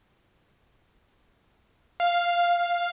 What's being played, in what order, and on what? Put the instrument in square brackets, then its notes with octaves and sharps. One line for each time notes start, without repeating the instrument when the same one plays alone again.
[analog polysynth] F5